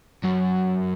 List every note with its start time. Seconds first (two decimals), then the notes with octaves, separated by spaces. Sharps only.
0.24 F#2